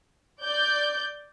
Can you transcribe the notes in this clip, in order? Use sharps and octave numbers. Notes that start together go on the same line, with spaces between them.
D5 G6